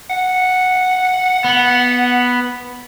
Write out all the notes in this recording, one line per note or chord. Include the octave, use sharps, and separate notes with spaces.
F#5
B3